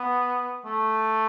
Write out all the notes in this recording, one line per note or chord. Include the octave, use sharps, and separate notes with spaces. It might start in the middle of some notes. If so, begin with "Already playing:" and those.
Already playing: B3
A3